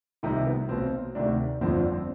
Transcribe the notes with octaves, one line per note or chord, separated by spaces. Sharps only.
C2 C3 D#3 D#4
B3
B1 B2 C4
D2 C3 D#3 D4
G1 F2 D3 F3 C4
D4
C4